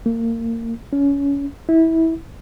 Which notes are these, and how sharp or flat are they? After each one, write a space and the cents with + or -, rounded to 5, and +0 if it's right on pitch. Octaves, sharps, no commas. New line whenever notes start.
A#3 -25
C#4 +25
E4 -20